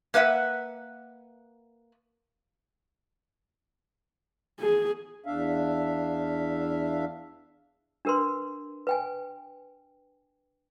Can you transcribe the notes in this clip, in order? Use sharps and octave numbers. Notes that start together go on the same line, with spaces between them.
A#3 B4 E5 F#5
G#4
E2 D4 E5 F5
D4 G4 A#4 B4 C6
B4 G5 G#5